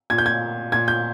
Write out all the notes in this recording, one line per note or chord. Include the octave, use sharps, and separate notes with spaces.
A#2 G#6
G6
G#6
A#2 G#6
G6